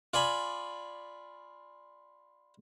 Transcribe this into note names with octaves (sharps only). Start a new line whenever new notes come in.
F4 D5 G#5 B5